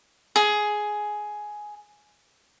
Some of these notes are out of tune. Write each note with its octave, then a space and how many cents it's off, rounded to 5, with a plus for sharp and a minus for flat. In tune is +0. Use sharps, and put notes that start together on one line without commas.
G#4 +10